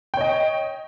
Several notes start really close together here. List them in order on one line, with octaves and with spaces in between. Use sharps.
G5 C#5 D#5